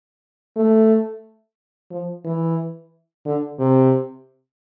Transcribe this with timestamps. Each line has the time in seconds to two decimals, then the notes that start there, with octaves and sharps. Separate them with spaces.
0.56 A3
1.91 F3
2.25 E3
3.26 D3
3.59 C3